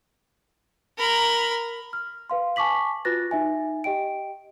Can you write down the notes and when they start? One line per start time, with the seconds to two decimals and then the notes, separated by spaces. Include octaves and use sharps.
0.98 A#4 B5
1.93 F6
2.30 B4 F5 C6
2.56 G#5 A5 C#6 D6 B6 F#7
3.05 F4 F#4 B4 F#6 A6 A#6
3.31 D#4 E5 G#5
3.84 G4 D#5 G5 D7